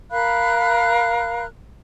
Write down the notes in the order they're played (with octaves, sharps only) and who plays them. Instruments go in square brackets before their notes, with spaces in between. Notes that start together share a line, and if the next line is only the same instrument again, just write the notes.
[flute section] A#4 F5 B5 F#6